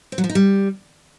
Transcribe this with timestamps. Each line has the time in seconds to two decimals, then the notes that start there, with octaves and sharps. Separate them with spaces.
0.12 C4
0.18 F#3
0.24 F3
0.29 D#4
0.35 G3